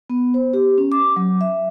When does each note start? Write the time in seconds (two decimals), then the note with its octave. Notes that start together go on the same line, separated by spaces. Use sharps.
0.10 B3
0.34 C5
0.53 G4
0.78 C#4
0.92 D6
1.16 F#3
1.41 E5